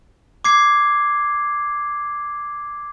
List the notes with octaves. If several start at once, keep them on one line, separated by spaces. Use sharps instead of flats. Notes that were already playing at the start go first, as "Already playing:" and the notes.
D6 G#6 C7